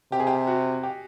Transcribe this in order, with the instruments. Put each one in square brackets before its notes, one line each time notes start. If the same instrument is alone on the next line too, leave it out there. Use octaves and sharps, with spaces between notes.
[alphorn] C3 [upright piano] G4
[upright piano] G#4
G4
F#4
G4